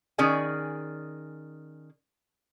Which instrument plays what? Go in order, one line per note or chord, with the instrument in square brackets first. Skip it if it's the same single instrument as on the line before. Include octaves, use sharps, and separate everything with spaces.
[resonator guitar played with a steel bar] D#3 C#4 G#4 D5 G#5